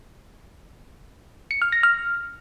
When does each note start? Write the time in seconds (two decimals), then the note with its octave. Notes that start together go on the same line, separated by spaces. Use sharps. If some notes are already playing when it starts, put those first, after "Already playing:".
1.51 C#7
1.62 F6
1.72 A#6
1.83 F6